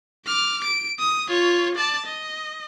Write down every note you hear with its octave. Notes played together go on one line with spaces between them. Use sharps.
D6 F6
D7
D#6
F4 C#5
D5 A5
D#5